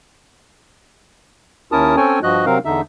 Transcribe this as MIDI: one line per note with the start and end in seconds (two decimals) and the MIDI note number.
1.72 1.96 39
1.72 1.96 61
1.72 1.96 64
1.72 1.96 70
1.72 1.96 81
1.72 1.96 87
1.97 2.20 60
1.97 2.20 61
1.97 2.20 69
1.97 2.20 73
1.97 2.20 79
1.97 2.20 80
2.23 2.45 43
2.23 2.45 53
2.23 2.45 66
2.23 2.45 75
2.23 2.45 90
2.46 2.58 48
2.46 2.58 54
2.46 2.58 60
2.46 2.58 70
2.46 2.58 77
2.65 2.81 40
2.65 2.81 50
2.65 2.81 63
2.65 2.81 76